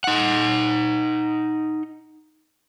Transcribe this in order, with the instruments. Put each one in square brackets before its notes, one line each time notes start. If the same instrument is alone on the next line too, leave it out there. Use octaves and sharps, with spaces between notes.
[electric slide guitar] D#4 F#5